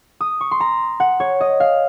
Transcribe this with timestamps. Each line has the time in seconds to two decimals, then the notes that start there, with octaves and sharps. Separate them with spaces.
0.21 D#6
0.41 C#6
0.51 C6
0.60 A#5
1.00 F#5
1.20 C#5
1.41 D#5
1.60 F5